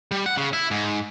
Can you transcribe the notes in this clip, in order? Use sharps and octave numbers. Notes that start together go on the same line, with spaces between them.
G3
F#5
C#3
E4
G#2